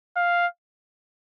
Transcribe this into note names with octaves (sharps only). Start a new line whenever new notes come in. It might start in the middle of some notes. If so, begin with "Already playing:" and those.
F5